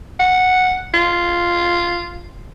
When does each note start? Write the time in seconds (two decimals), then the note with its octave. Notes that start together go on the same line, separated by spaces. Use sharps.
0.19 F#5
0.94 F4